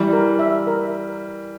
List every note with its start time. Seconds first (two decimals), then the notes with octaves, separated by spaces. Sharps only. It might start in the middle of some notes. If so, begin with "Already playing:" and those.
Already playing: E3 G3 E5
0.13 A#4
0.39 E5
0.67 A#4